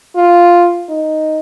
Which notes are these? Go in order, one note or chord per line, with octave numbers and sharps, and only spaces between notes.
F4
D#4